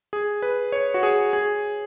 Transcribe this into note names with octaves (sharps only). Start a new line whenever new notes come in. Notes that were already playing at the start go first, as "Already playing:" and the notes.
G#4
B4
C#5
F#4
G#4
G#4